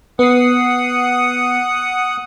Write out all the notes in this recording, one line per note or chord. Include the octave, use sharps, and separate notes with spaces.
B3 F#5 D#6 C7